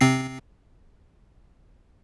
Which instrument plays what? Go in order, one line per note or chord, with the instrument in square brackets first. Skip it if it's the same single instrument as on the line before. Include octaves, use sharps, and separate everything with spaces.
[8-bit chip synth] C3 C4 C7